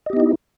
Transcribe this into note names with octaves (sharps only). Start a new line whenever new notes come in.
B3 D#4 E4 G4 D#5